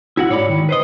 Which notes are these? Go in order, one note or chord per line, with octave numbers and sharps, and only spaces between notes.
E4 F#4 F#5
G#2 C#5 D5 B5
D#3
B4 C5 D#5